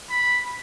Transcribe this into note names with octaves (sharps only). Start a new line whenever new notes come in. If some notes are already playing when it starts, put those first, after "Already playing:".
B5